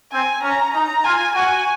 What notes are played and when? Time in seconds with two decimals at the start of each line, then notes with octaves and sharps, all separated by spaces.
0.12 C4 G#5
0.43 C#4 A#5
0.74 D#4 A#5
1.04 F4 G#5
1.35 F#4 G#5